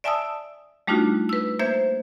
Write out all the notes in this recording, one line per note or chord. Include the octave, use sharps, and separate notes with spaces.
D5 E5 G#5 A5 D#6 E6
G3 A3 D4 D#4 F4 F#4
B4 E6
A#3 C5 E5 G6 G#6